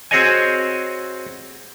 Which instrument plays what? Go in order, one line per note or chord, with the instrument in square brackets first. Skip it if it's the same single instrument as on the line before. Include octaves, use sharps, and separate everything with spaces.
[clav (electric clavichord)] C4 F#4 G#4 C#5 D#5 G#5